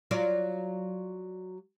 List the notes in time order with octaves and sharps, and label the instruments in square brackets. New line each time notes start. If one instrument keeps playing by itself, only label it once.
[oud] F#3 F4 D5